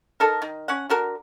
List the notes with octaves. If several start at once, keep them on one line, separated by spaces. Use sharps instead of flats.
D#4 A4 A#4
D#3
C#4 F#5
D3 F#4 A#4